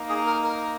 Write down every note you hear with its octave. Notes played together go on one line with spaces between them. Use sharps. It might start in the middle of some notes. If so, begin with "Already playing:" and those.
Already playing: A#3 D#4
G#4
A#4
A#4